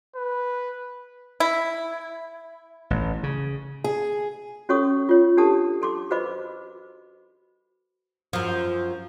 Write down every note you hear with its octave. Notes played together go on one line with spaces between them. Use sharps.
B4
E4
A1
C#3
G#4
C#4 F#4 A4 C#5 C#6 D#6
F4 C#5
D4 G4 A4 A5 D#6
A4 C6 D6
F#4 B4 C5 D#5 B5 D6
F#2 F3